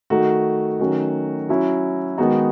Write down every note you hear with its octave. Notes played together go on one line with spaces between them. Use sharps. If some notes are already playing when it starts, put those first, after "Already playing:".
D#3 A3 D#4 F#4
D#3 F#3 A3 C#4
F#3 C#4 E4
D#3 G#3 B3 D#4 F#4